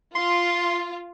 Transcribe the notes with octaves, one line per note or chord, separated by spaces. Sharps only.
F4 C6